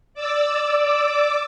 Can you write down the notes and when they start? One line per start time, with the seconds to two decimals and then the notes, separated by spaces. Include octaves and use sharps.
0.14 D5 D6 E6